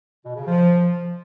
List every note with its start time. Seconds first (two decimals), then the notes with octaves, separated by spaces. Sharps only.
0.24 B2
0.36 C#3
0.47 F3